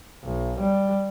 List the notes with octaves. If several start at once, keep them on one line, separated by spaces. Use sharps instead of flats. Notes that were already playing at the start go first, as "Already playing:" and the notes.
B1
G3